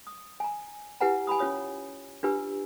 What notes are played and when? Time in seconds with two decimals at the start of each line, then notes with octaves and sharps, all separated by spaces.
0.07 D#6
0.40 G#5 A#5
1.01 E4 G4 B4 F#5 G#5 A#5
1.27 G#5 A#5 B5 D#6
1.39 C#4 F4 C#5 D#6
2.23 D4 F4 G4 B4 G#5 E6